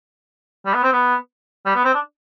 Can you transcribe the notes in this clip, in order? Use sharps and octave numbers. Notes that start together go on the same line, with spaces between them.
G3
B3
C4
B3
G3
B3
C4
D4